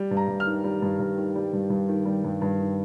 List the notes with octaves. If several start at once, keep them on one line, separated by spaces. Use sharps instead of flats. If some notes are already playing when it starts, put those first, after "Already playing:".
Already playing: G3
G2
A#5
G2
F6
D#3
G3
G2
G2
D#3
G3
G2
G2
D#3
G3
G2
G2
D#3